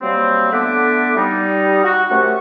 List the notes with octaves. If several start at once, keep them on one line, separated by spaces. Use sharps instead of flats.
C3 F#3 G3 A#3 C4
D3 A3 B3 E5 F#5 D6
G3 D#4
F#4
F#2 C3 A3 C#4 F#5 C#6